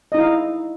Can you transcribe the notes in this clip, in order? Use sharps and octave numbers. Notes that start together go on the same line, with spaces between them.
D#4 E4 D#5 F5